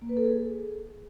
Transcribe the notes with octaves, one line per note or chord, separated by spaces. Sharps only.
A#3
B4
A4
G#4